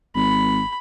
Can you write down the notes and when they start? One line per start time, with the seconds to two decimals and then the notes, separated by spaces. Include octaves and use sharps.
0.15 G#1 B5